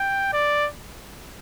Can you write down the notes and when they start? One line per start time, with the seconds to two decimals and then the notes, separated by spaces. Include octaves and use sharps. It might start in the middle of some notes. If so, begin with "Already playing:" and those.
Already playing: G5
0.33 D5